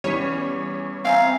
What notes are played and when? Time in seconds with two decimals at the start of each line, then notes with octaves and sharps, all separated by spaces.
0.04 E2 G3 C#4 C#5 B6 D#7
1.05 C4 E5 F5 G#5 A#5